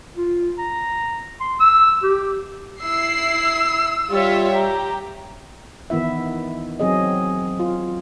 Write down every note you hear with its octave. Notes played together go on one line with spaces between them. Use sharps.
F4
A#5
C6
E6
G4
E4 E6 C7
G3 F4 C#5 E5
G4 A#5
D#3 E3 B3 E4 E5
F#3 C4 G#4 D#5
F4